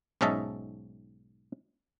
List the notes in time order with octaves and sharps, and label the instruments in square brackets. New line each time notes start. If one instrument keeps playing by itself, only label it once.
[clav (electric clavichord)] B1 G#2 C#4 D#5 E5 A5